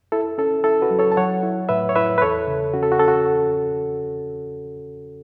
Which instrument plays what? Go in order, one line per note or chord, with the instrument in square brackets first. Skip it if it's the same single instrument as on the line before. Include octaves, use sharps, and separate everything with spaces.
[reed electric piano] E4 A4
C#4 A4
E4 A4
F#4 B4
F#3
A4 C#5
A5
F#3 C#5 F#5
E4
A2 B4 E5
C#5
E4 B4 E5
B4
E2 A4 C#5
C#3
C#4 F#4
A4
F#4
C#4 A4
F#4